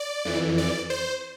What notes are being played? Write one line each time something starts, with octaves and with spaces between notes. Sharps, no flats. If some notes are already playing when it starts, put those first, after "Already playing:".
Already playing: D5
F2 E3
D5
C5